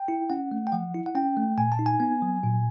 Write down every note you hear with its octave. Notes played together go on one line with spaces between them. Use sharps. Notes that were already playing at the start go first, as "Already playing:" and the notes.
Already playing: G5
E4
C#4 F#5
A3
G5
F3 F#5
E4
F#5
C#4 G5
A3
A#2 G#5
A5
D#4
G#5
B3
F#3
A#2